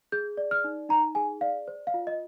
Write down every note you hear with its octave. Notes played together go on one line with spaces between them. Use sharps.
G#4 G6
D5
F6
D#4
D#4 A#5
G#4 G#5
D5 F5
C5
F5
F4
D#5